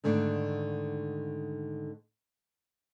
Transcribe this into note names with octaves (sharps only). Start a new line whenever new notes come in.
G#2 D3 D#3 A3 D4